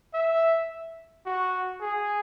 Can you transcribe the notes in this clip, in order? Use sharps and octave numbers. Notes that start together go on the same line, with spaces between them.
E5
F#4
G#4